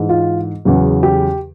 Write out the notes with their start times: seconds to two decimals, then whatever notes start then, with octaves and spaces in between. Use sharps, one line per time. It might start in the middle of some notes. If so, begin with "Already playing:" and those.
Already playing: G#2 E3 G#3
0.09 F4
0.65 E2 C#3 F#3
1.03 G4